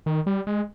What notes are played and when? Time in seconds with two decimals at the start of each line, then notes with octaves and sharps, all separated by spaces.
0.06 D#3
0.26 G3
0.47 G#3